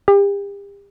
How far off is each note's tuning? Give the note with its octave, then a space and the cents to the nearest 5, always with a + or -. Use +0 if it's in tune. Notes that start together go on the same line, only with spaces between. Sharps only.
G4 +40